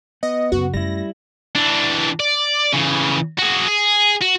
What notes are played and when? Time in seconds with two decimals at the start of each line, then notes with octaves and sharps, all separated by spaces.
0.23 B3 D#5
0.52 F#2 C#3 F#4
0.74 F#2 G3 A3 E4 A#6
1.56 E3 D4
2.20 D5
2.73 C#3 E3
3.38 F#4 G#4
3.67 G#4
4.21 F#4